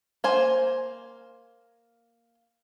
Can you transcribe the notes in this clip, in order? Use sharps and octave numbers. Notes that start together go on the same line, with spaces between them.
A#3 C5 G#5